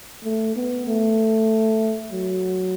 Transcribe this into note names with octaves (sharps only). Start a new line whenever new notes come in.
A3
B3
A3
F#3